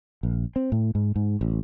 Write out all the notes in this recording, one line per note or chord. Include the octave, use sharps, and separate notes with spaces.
A#1
C4
A2
G#2
G#2
A1